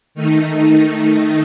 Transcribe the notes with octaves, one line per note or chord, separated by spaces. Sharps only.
D#3 A3 D#4